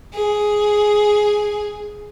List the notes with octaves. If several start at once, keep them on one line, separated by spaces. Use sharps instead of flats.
G#4